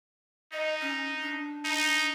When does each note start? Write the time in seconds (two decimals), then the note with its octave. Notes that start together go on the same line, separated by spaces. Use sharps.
0.52 D#4 D#5
0.81 C#4
1.22 D4
1.64 D#4